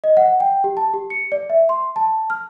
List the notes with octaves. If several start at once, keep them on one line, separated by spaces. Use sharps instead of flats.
D#5
F#5
G5
G4
A5
G4
C#7
D5
E5
C6
A5
F6